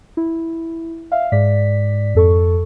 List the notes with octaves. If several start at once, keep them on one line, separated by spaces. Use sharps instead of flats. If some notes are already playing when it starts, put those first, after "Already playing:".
E4
E5 F5
G#2 D5 B6
F2 A4 C#6